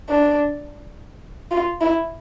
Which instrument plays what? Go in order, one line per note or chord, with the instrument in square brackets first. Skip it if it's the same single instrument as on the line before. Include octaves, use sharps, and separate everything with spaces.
[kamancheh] D4
F4
E4